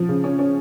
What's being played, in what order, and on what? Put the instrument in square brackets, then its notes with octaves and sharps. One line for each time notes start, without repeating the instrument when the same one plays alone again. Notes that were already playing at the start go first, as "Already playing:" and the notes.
Already playing: [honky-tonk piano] F3
C#3
C#4
C#4